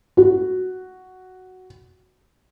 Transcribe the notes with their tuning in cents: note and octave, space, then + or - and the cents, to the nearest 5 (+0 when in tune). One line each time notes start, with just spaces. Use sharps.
F#4 +5